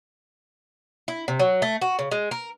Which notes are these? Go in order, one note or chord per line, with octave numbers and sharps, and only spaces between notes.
E4
C3
F#3
A3
F#4
C#3
G#3
A#4